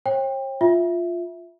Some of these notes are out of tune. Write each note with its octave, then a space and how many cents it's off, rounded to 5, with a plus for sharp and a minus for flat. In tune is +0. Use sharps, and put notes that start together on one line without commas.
C#5 -45 G5 +20
F4 +0 E5 +0